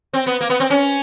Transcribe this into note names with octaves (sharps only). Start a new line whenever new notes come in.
C4
B3
A#3
B3
C4
C#4